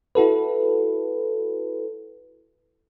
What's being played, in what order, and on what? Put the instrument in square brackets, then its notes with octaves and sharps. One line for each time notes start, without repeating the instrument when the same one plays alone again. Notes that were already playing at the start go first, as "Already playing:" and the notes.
[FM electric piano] E4 F#4 A4 B4